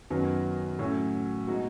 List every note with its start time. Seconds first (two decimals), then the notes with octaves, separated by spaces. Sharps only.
0.10 F#2 D#3 F#3 B3
0.79 A2 F#3 C#4 F#4
1.47 B2 G#3 D#4 F#4